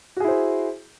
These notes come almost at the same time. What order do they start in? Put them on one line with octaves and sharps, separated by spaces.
F#4 G#4 E4 C5